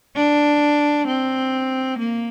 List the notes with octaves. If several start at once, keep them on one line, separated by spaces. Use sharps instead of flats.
D4
C4
A#3